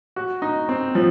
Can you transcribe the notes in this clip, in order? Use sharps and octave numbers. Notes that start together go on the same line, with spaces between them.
F#4
D#4
C4
F3